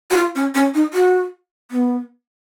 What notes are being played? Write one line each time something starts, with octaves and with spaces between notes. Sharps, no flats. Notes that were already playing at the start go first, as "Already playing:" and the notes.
F#4
F4
C#4
C#4
D#4
F#4
B3